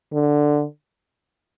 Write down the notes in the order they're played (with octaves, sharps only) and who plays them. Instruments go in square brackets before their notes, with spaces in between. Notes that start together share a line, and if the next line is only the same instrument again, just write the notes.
[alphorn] D3